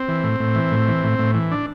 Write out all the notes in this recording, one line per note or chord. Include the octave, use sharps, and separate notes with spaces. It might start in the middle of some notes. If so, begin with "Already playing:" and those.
Already playing: C4
E3
A2
A2
E3
A2
E3
A2
A2
E3
D4